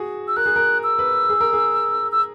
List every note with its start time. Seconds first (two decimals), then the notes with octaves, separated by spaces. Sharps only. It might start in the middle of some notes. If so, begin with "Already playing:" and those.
Already playing: F#4 G#4
0.28 E6
0.36 A#4 F#6
0.46 G#4
0.56 A#4
0.84 E6
0.99 B4
1.29 G#4
1.41 A#4
1.53 G#4
2.12 E6